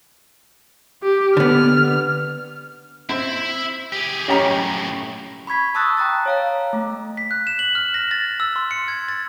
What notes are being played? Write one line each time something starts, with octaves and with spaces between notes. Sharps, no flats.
G4
D3 B3 F6
C4 E4 E5
G4 G#4
F#2 A2 C#4 G4 A#5
B5 C#6 G#6 B6
A5 C#6 D#6 E6 F#6 A6
G5 A#5 D#6 A6
C#5 F5 A#5
A3
B6
F#6
E7
F#7
F6
A#6
A6
E6
C6
C#7
G#6
A6